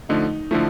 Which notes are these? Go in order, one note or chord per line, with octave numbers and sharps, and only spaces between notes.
D3 F3 A3 D#4
D3 F3 A3 E4